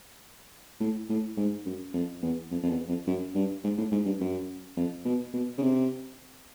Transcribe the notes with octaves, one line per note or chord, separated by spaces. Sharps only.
A2
A2
G#2
F#2
F2
E2
F2
F2
E2
F2
F#2
G2
G#2
A2
G#2
G2
F#2
F2
B2
B2
C#3
C3